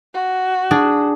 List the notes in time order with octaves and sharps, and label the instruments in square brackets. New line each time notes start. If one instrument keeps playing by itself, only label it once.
[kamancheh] F#4
[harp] D4 G#4